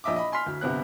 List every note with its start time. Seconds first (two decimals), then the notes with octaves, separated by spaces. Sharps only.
0.04 A#1 D#5 E5 D6
0.16 D#5 B5
0.32 G#5 C6 F6 B6
0.46 D2
0.61 G1 C3 B3 F#6